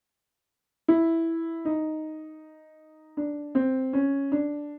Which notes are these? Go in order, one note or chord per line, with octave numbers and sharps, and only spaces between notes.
E4
D#4
D4
C4
C#4
D4